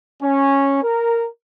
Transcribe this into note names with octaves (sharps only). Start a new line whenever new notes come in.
C#4
A#4